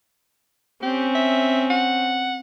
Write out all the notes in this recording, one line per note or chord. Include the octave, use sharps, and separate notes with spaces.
C4 C#4 G4
E5
F#5